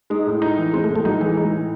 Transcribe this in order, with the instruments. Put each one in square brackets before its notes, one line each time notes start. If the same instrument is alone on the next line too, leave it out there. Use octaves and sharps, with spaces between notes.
[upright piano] G#3 [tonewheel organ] D#4
[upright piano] A2
D#4
E3
[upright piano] G#3 [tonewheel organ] C4
[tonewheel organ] A3
[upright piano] A2
[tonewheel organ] A3
[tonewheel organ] F#3 [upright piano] D#4
[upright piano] E3 [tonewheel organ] G#3
[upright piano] D#4
A2